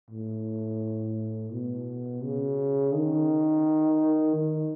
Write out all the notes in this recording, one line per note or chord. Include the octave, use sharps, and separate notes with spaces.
A2
B2
C#3
D#3
D#3